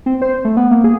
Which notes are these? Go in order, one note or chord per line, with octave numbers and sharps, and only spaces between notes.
C4
C5
A3
B3
A#3
G#4